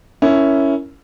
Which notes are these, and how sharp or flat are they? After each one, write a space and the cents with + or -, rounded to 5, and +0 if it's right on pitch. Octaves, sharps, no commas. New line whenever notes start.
C#4 +5 E4 +0 A#4 +0